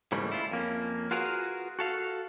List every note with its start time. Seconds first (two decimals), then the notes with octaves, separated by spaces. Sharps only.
0.12 G#2 C#3 E3 G3 A3 A#3
0.32 E4 F4
0.51 F2 A#3 C#4
1.11 F4 F#4 G#4 A#4 B4 F5
1.79 F#4 A4 F5